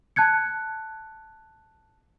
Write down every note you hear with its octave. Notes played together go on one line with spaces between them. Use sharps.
A5 F#6 G#6 C#7